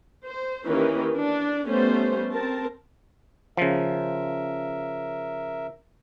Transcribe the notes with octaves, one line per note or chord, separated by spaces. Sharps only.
C5
D#3 E3 A#3 C#4 G4 B4
D4
G3 A3 B3 C#4 C5
C4 A#4 A5
C#3 F3 A#4 E5